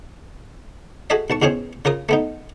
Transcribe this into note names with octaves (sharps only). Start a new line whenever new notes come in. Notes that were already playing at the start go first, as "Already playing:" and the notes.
F#4 G#4 A4 D#5 E5
B1 A5 C#6
E2 B2 C4 C#4 G#4
C#3 F4 A#4 D#6
A3 B3 D#4